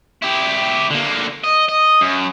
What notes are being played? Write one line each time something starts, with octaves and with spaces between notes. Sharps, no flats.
E4 G4
D3 A#3
D#5
D#5
F#2